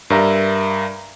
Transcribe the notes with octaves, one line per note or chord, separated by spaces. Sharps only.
G2 A#4 D5 E5 A#5